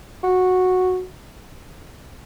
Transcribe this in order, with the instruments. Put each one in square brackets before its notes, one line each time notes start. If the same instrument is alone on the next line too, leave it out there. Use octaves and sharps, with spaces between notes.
[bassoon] F#4